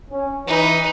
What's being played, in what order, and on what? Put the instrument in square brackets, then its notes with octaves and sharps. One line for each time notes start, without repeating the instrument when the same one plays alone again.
[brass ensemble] C#4
[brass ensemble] E3 [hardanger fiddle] D#4 B4